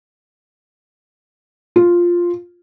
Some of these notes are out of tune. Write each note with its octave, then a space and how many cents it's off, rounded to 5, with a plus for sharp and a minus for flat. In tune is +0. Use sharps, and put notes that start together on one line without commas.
F4 +0